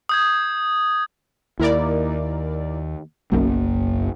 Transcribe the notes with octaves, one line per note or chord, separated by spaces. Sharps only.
D#6 G6 G#6
D#2 E4 A#4 D5
F#1 B1 F#2 A#3